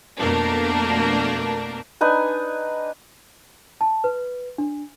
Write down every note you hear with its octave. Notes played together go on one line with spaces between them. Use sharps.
F2 B2 A3 A#3 D4 A#4
D4 D#4 B4 G#5
A5
B4
D4